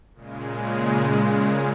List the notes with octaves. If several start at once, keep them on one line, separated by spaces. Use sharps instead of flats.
A#2 C#3 G#3